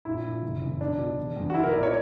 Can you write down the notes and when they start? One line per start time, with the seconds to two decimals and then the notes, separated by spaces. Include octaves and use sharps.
0.05 A#1 E4
0.24 A#2
0.43 F#1
0.62 E2 C#3
0.80 B1 D4
0.98 B2
1.18 E1
1.36 E2 D3
1.50 F#4
1.54 B1 E4
1.64 A#4
1.73 A#2 D5
1.83 C#5